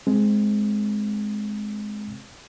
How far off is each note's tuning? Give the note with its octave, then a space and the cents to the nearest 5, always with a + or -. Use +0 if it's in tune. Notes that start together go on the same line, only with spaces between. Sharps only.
G#3 +15 C4 +0